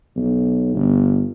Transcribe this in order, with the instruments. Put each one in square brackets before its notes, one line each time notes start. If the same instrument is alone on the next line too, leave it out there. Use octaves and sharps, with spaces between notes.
[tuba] B1
G1